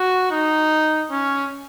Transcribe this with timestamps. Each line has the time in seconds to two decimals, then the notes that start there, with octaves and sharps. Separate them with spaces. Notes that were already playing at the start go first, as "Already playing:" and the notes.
Already playing: F#4
0.31 D#4
1.11 C#4